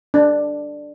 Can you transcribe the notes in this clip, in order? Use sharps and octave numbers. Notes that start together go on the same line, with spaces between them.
D4